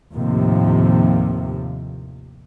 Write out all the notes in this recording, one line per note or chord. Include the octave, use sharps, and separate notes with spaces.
D#2 A2 C3 F3